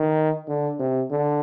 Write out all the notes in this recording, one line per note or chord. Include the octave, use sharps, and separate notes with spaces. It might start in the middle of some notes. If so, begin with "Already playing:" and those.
Already playing: D#3
D3
C3
D3